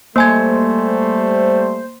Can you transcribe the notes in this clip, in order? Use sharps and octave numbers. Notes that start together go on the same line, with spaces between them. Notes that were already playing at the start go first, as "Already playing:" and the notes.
G3 A3 A#3 C5 G#5 G#6